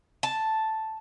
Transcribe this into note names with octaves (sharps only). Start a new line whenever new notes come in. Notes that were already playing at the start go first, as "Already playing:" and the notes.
A5